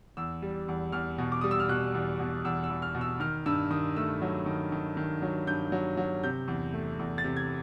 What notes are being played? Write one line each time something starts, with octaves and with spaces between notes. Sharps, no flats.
E2 E6
G3
E2
E2 F6
B2
D6
G3 D#6
E6
F6
B2 F#6
E2
B2
E2 E6
E6
E2
F6
B2
E6
D#3 F6
G2 E6
D#3 D#6
A3 E6
F#3
D#3
D#3
D#3
F#3
G2 G6
F#3
F#3
C3 G6
E2
A3
E2
A6
C3
G#6